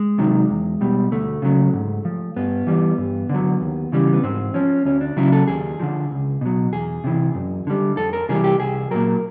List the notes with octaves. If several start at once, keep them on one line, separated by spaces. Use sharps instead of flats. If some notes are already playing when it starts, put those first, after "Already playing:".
Already playing: G#3
C3 D#3 F#3
E2
B2 G3
D2 A3
C#3 F#3
G#2
F3
G2 B3
E3 G3
G2
D3 F#3
D#2
C#3 E3 G3
B3
G#2 C4
F3 C#4
D2 C#4
D4
C#3 F#3 E4
A4
D#2 G#4
D3 F3
C#2
B2 F#3
E2 G#4
C3 E3
F#2
D3 G3
F2 A4
A#4
C3 E3 G3 G#4
G4
C2 G#4
A#2 F#3 A#4